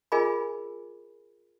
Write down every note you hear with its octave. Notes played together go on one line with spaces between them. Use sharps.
F4 G#4 A#4 D#5 G#5 B5